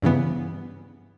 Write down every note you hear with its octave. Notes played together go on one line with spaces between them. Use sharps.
G2 C#3 E3 B3